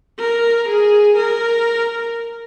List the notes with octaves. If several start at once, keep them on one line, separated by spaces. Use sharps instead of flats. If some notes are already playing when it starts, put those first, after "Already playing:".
A#4
G#4
A#4